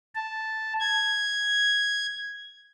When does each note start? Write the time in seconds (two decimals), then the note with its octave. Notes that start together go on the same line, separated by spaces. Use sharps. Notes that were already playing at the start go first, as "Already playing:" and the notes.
0.15 A5
0.80 G#6